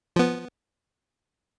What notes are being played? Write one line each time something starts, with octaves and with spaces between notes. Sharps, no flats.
F3 B3